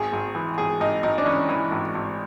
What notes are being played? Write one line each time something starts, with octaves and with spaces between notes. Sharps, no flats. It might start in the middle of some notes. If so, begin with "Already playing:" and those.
Already playing: G#1 G#4
G#1
E3
G#1 G#4
G#1 D#4
G#1 D#4
D4
E3 C#4
E3
G#1
G#1